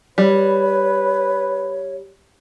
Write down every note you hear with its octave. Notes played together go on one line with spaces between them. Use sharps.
G3 B4 C#5